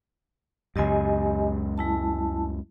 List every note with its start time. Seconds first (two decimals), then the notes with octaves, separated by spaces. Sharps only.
0.76 C#2 F#2 G4 D#5 G#5
1.78 G#3 E4 A5